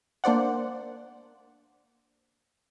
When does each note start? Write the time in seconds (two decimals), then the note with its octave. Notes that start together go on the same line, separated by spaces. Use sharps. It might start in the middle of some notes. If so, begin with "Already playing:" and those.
0.24 A#3 D4 C5 D5 F#5